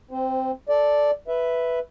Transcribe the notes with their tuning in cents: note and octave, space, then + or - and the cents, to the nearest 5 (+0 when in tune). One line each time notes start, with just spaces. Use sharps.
C4 +0 C5 -25
A4 -5 D5 +0
B4 +0 E5 +0